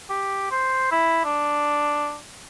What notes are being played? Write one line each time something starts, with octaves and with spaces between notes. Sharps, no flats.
G4
C5
E4
D4